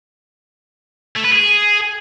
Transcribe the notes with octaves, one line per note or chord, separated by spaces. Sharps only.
A3
B4
G#4